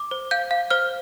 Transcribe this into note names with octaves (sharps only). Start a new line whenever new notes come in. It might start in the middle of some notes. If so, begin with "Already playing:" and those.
Already playing: D6
C5
F5 G6
F5
C5 F6